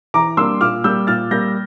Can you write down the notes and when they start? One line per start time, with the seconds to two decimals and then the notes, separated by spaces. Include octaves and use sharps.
0.14 E3 A#5 D6
0.37 G3 A#3 D4 C6 E6
0.61 A#2 D6 F6
0.84 G3 A#3 E6 G6
1.07 A#2 F6 A6
1.31 G3 A#3 G6 A#6